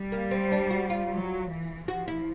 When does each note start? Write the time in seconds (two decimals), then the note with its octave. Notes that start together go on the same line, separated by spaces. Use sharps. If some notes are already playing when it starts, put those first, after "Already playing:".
Already playing: G3
0.12 A#3
0.31 C4
0.52 D4
0.71 F#4
0.90 F4
1.10 F#3
1.48 E3
1.88 F3 F#4
2.08 E4